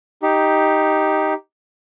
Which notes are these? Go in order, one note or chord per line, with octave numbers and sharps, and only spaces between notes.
D#4 G4